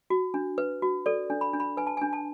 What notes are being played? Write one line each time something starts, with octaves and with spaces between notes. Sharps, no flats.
F#4
D4
B4
F#4
A4 D5
D4
B5
D4
B5
B4 G#5
A5
D4 G#5
A5